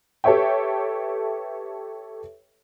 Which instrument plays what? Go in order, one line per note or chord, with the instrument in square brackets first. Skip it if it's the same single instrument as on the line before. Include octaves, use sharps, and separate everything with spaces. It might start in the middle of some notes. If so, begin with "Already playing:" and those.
[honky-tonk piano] G4 A4 B4 C#5 E5 G5